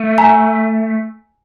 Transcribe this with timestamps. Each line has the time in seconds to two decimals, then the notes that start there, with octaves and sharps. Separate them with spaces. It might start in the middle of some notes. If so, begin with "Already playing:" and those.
Already playing: A3
0.18 G#5 A#5